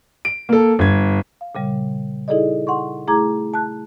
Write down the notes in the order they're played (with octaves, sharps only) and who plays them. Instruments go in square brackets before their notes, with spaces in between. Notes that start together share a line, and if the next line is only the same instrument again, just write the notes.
[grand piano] D7
A#3 A4
G1 G#6
[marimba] F5
A#2 C#3 G3
D#4 E4 G#4 A4 D5 D#5
F#5 C6 C#6
A3 E4 G#4 A#5 D6 G#6
A5 F#6